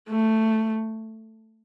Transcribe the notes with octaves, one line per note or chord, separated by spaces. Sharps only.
A3